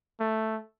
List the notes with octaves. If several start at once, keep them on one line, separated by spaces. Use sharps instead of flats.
A3